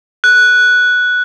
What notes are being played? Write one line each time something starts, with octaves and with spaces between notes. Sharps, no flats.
F#6